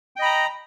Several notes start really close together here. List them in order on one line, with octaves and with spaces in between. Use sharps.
G5 D#5 B5 A#5